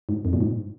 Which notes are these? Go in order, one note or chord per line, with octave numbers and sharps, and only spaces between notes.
G#2
F2
A#2
G#2